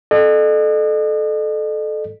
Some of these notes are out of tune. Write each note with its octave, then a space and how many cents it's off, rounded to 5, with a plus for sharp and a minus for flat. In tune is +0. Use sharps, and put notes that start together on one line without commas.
A4 -20 D#5 -45